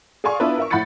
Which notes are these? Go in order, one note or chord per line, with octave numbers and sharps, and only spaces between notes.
G#4 D5 F5 G#5 C6 C#6
B3 D4 E4 F4 B4
A#4 E5 C#6
A2 F#5 B5 G6 A6 C#7